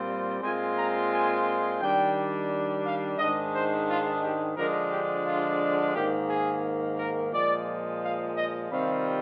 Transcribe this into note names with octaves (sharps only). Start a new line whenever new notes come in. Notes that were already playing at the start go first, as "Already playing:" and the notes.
Already playing: A#2 G3 C4 F4
A#2 G#3 C4 F4 G#5
A#5
G#5
D#3 G3 D4 G5
F5
G#2 D#3 G#3 D4 D#5
C5
F4
G4
D3 F3 G#3 D4 A#4
G4
F4
G#2 D#3 A#3 G4
G#4
A#4
A#2 F3 G#3 D5
F5
D#5
C3 D#3 G3 C4 F4 F5